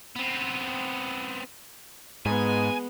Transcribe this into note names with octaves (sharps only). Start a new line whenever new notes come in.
B3 C4
G#2 G#3 B3 G#5